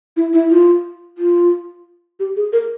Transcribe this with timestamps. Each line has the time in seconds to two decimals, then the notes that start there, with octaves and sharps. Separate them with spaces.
0.17 E4
0.33 E4
0.51 F4
1.18 F4
2.20 G4
2.36 G#4
2.53 A#4